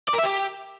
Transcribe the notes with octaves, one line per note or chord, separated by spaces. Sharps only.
D5
A#4
E5
G4